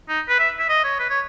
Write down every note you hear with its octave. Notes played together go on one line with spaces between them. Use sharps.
D#4
B4
E5
E5
D#5
C#5
B4
C#5